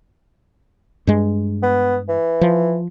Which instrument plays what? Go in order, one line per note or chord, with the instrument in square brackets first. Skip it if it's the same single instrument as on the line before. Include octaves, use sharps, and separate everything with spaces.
[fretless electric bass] G2 G#3
[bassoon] B3
E3
[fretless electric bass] F3